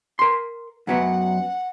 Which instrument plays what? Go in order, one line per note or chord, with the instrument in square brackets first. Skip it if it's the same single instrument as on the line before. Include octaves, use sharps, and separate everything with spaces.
[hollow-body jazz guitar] A#4 C6
[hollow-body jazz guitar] F#2 F#3 B3 [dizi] F#5